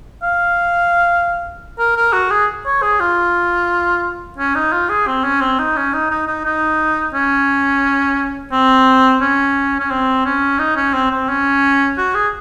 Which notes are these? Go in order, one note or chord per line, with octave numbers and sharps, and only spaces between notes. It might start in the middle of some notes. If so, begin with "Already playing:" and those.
F5
A#4
A#4
F#4
G#4
C#5
G#4
F4
C#4
D#4
F4
G#4
C4
C#4
C4
D#4
C#4
D#4
D#4
D#4
D#4
C#4
C4
C#4
C#4
C4
C#4
D#4
C#4
C4
C4
C#4
F#4
G#4